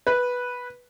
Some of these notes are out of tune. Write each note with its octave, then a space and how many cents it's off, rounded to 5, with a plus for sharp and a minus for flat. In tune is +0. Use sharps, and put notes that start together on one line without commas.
B4 -5